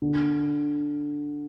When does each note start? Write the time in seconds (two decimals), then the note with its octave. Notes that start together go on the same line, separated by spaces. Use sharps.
0.02 D3